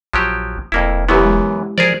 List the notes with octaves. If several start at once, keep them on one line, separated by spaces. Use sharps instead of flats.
A#1 F3 F#3 G4
E1 F2 A#3 E4
F#2 E3 B3 E4 G4 B4
G#3
F3 G#4 A#4 C5 D5